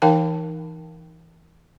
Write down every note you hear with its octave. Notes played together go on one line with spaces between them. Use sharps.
E3 D#4 A#4 F5 G5 A5